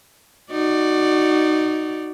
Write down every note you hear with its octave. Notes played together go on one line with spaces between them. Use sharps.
D#4 F#4 D5